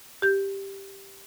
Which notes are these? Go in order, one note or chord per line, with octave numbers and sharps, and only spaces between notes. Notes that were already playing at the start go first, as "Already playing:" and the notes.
G4 G6